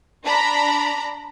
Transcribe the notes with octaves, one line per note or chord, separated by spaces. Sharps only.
D4 A#5 B5